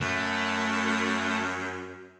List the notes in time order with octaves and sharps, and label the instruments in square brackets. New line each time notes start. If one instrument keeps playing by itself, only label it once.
[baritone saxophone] F#2 [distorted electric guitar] A3